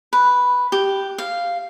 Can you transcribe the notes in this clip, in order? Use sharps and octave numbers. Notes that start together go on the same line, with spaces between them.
B4
G4
F5